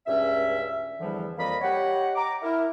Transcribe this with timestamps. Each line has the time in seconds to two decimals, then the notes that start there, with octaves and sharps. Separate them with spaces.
0.06 C#2 G2 C#4 E5
1.00 E2 D3 E3 F3 G3
1.38 F2 A#3 D5 D#5 B5
1.62 G4 C#5 D#5 F#5
2.15 A#5 D6
2.43 E4 A#4